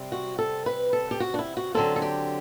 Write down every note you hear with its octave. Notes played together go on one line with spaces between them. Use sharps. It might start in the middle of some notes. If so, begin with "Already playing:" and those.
Already playing: C3 G3 C4
F#4
A4
B4
A4
G4
F#4
D4
E4
F#4
D3 F#3 C4 A4
A4
G4